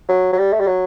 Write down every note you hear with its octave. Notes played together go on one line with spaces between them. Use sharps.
F#3
F#3
G3
A3
G3
F#3